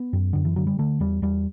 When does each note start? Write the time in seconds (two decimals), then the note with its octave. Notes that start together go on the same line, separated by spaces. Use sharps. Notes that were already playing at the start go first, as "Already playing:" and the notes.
Already playing: B3
0.13 F#2
0.33 F#2 D3
0.45 E3
0.56 D3 F#3
0.67 G3
0.79 D3 A3
1.00 E2 G3
1.22 E2 G3